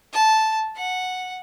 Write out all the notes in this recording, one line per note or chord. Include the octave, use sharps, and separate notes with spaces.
A5
F#5